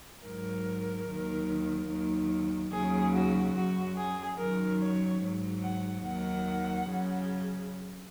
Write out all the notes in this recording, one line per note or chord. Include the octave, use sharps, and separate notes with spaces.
G#2 F#3 A#4
D#2 D#3 F#3
D#2 D#3 F#3
D#2 C#3 F#3 G#4
F#4
F#2 F#3 F#4
G#4
F#2 D#3 F#3 A#4
C#5
G#2 F#3
F#5
D#2 D#3 F#3 F#5
F#2 C#3 F#3